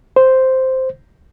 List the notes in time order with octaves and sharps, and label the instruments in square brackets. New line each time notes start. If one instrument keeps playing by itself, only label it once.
[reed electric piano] C5